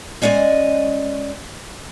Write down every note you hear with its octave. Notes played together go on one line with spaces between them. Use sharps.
G#3 C#4 D5 D#5 G#5